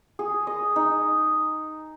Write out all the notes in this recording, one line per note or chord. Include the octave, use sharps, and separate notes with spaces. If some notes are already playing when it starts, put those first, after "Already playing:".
G#4
D#5
D#4